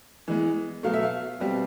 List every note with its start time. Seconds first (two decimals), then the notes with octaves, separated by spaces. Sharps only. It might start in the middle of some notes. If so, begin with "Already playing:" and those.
0.28 E3 G#3 B3
0.83 B2 F#3 A3 F5
0.94 E5
1.03 F5
1.40 B2 G3 C4